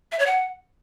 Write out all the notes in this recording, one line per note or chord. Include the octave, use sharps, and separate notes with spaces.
E5
C#5
F#5